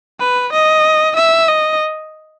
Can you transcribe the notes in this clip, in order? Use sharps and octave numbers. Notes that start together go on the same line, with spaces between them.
B4
D#5
E5
D#5